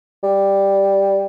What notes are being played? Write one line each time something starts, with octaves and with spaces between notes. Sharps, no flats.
G3